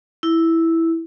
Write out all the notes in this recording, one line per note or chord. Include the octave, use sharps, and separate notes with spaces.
E4